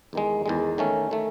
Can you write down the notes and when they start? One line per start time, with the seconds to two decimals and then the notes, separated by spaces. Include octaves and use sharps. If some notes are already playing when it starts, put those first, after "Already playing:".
0.13 E2 D#3 G#3
0.46 E2 D#3 G#3
0.78 D#3 A3 C#4
1.11 D#3 A3